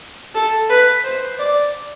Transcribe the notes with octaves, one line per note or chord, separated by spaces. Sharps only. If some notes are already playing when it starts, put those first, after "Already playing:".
A4
B4
C5
D5